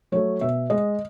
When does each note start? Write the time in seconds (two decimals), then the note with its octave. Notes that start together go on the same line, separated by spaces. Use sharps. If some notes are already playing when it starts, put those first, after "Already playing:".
0.12 F#3 A3 C#5
0.41 B2 E5
0.70 G#3 D#5